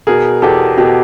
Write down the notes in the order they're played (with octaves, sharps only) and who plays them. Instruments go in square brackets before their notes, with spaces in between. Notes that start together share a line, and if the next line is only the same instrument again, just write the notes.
[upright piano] B2 G#4 A#4
E2 G4 A4
B2 G4 A4